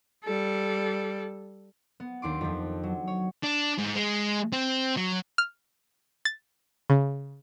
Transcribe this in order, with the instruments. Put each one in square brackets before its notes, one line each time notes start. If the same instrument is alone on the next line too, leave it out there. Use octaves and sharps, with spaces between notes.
[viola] G3 A4
[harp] B3
D#2 D4 C6 D6
F2 F3
F#3
C#5
[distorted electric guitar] D4
G#2
G#3
C4
F#3
[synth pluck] F6
A6
C#3